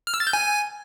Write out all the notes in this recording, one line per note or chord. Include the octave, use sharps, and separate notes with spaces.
F6
E6
A6
G6
G#5